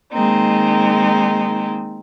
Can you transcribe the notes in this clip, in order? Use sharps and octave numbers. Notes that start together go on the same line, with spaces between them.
D#3 G#3 A#3 C4 D#4